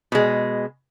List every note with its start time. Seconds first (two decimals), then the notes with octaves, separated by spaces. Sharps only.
0.12 B2 G#3